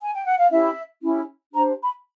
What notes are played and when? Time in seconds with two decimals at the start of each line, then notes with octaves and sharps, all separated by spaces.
0.01 G#5
0.14 G5
0.26 F#5
0.38 F5
0.49 C#4 E4 G4 E5
1.02 C#4 E4 G4
1.54 D4 G4 C5 A#5
1.81 B5